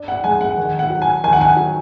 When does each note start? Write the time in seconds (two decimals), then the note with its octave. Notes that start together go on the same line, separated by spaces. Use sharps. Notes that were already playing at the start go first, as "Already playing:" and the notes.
Already playing: D4
0.08 F#5
0.24 G#3 G#5
0.41 F#5
0.57 D#3
0.79 F#5
0.90 F#3
1.02 G#5
1.24 D#3 G#5
1.33 F#5
1.41 G#5
1.57 F#3